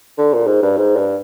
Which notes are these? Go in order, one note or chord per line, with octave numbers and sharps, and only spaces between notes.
D3
A#2
G#2
G2
G#2
G2